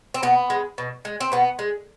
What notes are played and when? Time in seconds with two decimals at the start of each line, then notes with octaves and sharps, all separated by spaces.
0.14 C4
0.23 B2 B3
0.50 G#3
0.78 B2
1.05 G#3
1.20 C4
1.32 B2 B3
1.59 G#3